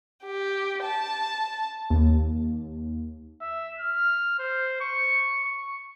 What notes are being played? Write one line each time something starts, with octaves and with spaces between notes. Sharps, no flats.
G4
A5
D#2
E5
F6
C5
C#6
C#6